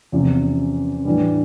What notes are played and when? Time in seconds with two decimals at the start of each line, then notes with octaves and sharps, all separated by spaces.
0.12 E2 C3 F3 C#4
0.27 C4
0.40 C#4
1.05 A2 E3 G3 D4